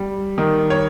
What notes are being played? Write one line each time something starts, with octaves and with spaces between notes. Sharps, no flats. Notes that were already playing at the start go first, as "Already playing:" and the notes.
Already playing: G3
D#3
C#5